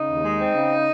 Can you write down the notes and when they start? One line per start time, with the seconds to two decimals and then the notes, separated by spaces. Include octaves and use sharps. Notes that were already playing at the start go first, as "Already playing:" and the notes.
Already playing: C#3 D#4
0.09 D#2
0.24 G#3
0.40 C4
0.55 C#3